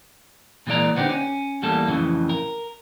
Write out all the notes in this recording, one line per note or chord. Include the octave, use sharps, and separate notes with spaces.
A#2 E3 G#3 A#3 D5 A#5
D3 B3 C4 D4 D#4 G4
C#4
E2 A2 G3 A#3 A4
F2 A2 C#3 E3
A#4